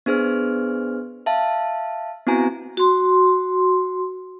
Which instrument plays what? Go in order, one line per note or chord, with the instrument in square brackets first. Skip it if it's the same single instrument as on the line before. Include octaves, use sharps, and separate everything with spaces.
[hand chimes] B3 D4 G#4 C5 F6
E5 F5 A5
B3 C4 E4 F#4 G#5 A#5
[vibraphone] F#4 C6